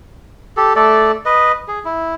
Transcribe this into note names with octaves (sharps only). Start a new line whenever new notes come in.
G4 A4
A3 A4 D5
B4 D#5
G#4
E4